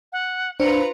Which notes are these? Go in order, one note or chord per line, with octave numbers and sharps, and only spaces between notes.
F#5
D4 F4 B4 C5 A#5 C#7